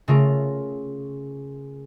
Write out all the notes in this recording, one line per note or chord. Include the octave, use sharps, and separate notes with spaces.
C#3 A3 F4 A#4